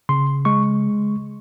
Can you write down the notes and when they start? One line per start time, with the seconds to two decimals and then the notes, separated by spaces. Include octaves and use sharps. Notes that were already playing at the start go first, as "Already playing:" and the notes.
0.09 C#3 C6
0.45 G#3 C#6